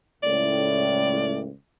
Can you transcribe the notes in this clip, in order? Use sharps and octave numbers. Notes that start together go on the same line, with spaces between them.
C#2 A2 D5